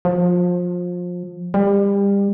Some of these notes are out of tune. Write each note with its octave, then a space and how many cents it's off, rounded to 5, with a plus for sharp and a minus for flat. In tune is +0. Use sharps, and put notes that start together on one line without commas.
F3 +25
G3 +30